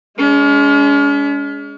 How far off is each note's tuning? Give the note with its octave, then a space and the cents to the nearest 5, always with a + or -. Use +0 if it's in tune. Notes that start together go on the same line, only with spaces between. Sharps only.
G#3 +0 C#4 +40